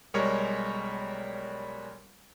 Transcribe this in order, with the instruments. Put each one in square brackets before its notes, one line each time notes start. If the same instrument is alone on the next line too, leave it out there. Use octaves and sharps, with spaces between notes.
[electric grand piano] B1 G3 G#3 A#4 C#5 C#6